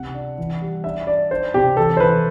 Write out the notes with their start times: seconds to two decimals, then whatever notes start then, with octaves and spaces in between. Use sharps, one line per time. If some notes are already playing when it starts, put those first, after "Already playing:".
Already playing: C3 F#5
0.14 D4
0.38 E3
0.62 G3
0.84 D4 E5
1.07 D4 D5
1.31 D4 C5
1.54 C3 G4
1.77 E3 A4
1.97 C5
2.00 E3 B4